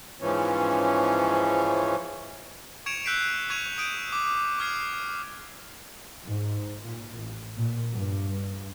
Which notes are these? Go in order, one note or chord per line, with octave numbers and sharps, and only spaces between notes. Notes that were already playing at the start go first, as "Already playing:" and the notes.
G#2 E3 F3 C#4
C#6 G#6 C#7 D7 E7 F7
E6 F#6 G6 B6 C7 D7
C#6 G#6 D#7 F7
D#6 G6 D7 D#7
D6
C#6 D6 F6 G#6 C7
G#2
A#2
A1
A#2
G2